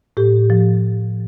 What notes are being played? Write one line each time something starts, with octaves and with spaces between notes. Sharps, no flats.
A2 G4
F3